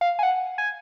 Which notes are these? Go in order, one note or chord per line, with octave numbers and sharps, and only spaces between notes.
F5
G#5
F#5
G#5